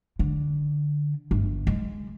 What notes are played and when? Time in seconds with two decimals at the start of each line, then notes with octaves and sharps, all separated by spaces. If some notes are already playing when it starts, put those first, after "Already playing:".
0.19 D3
1.31 G1
1.67 G#3